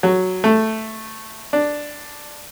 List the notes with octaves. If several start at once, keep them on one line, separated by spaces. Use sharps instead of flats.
F#3
A3
D4